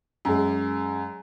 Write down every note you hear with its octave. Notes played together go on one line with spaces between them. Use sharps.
F#2 G#3